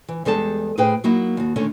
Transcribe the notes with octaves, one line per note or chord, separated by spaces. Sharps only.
E3
E2 G3 G#3 A4 A5
A2 G#4 B4 C5 G5
F#3 A#3 D#4 E4 F#4
D#2 F#4
D3 D#3 A3 C#4